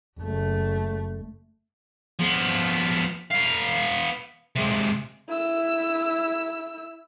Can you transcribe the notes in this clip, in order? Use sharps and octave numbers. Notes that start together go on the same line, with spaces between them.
F#1 A3
F3 B3
B3 F5
C3 G#3
E4 E6